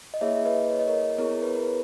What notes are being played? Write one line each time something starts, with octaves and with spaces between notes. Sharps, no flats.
D#5
A#3 E4 G#4 C#5 E5
B4 D#5
C#5
D#5
A#4 C#5
B3 E4 G#4 A#4 C#5
B4
A#4
B4